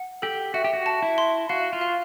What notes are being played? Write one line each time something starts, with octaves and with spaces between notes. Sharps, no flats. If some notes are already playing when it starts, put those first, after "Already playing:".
Already playing: F#5
G4 A4
F#4 E5
G4
F#4
A5
E4
C6
F#4 F5
F4
F5